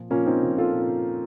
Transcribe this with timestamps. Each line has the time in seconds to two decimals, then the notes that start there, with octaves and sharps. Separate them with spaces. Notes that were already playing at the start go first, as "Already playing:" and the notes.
Already playing: A#2 F3
0.10 A#2 F3 A#3 C#4
0.26 C4 D#4
0.43 A#2 F3
0.58 F4 A4
0.74 A#2